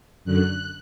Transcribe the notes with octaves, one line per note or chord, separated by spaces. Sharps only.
F#2 D3 F#6